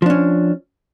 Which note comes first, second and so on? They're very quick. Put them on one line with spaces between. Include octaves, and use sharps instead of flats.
F3 D4 C#4